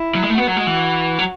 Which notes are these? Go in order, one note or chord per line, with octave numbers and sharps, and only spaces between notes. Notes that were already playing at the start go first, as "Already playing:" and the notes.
Already playing: E4
F#3
G#3
A3
B3 F#4
F#3
G#3
E3
F#3